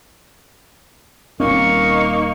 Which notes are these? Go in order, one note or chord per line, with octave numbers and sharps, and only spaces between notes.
D#1 A#3 C4 C#4 D#4 C#6